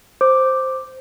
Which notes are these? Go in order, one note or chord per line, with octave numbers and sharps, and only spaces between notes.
C5 D6